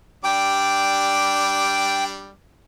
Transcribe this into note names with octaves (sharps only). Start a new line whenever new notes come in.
G3 D4 G5 D6